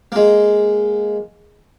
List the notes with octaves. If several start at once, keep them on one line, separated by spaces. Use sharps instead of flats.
G#3 A#3